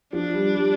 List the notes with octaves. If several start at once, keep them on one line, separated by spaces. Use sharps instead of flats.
F3 D4
G3
G3